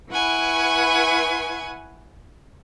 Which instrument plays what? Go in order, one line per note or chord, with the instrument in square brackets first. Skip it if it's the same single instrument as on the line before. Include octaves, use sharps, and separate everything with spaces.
[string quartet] E4 B4 F#5 G#5 C#6